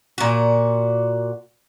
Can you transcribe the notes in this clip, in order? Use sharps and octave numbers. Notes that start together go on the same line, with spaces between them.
A#2 F#4